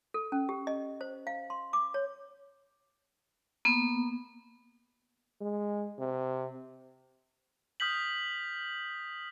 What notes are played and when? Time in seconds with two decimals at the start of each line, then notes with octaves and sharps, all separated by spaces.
0.14 A4
0.32 C#4
0.49 G4
0.67 D#5
1.01 C5
1.27 F5
1.50 C6
1.73 D6
1.94 C#5
3.65 A#3 B3
5.41 G#3
5.98 C3
7.80 D#6 F6 G6 B6 F#7